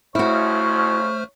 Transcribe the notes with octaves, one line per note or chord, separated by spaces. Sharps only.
F2 C#3 A3 E4 F#4 C5 C#5 F6